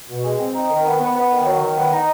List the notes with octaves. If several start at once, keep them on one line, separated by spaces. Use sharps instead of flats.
B2
G#3
C4
D#4
D#3
B3
B3
B3
D#3
F#3
D#3
B3
D#4